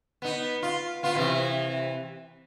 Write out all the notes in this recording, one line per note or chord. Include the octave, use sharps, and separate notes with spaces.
B3 D#4
F4
B3 F4
C3 E3